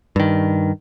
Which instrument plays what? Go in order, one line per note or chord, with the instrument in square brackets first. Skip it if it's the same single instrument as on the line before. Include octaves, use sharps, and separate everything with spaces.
[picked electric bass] G2 D#3